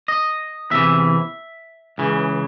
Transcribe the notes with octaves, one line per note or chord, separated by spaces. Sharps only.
D#5
E2 C3 E3 E5
C#2 C#3 E3